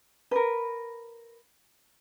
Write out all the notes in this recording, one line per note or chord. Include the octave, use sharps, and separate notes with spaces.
A#4 B4